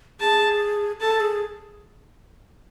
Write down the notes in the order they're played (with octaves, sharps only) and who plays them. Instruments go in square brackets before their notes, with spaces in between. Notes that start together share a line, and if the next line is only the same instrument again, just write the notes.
[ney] G#4 [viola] A5
[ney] A4 [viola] A5
[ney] G#4